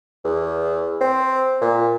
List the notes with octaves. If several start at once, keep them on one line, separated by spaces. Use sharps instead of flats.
E2
C4
A#2